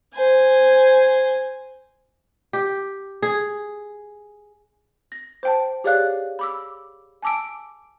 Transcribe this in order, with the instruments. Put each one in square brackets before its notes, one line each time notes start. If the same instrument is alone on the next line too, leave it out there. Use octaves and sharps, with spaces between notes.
[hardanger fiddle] C5 G#5
[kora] G4
G#4
[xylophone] A#6
C5 G5 A5
G4 G#4 C#5 D5 F5 F#6
B5 D6 E6
G#5 A5 D6 E6 D7